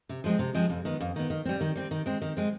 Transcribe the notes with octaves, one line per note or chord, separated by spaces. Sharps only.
C3
F3 G#3 C4
C3
F3 G#3 C4
F2
D#3 B3
F2
D#3 B3
D#3
G3 C4
D#3
G3 C4
D#3
G#3 C4
D#3
G#3 C4